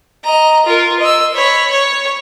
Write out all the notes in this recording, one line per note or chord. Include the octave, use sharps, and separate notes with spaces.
D#5 A#5
F4 A#4
D#5 E6
C#5 B5
C#5